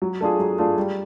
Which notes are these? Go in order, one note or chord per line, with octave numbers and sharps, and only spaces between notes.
F#3
A3 D4 F4 G#4
F#3
A3 D4 F4 G#4
G3